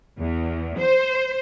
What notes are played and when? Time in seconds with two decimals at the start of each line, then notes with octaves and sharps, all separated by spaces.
0.19 E2
0.78 C5